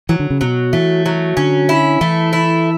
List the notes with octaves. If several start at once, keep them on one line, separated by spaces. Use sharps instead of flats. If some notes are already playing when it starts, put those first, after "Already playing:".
E3 F#3
D3
C#3
B2 F#3
E3 A3
F#3
D3 C#4
E4
E3 A3
E4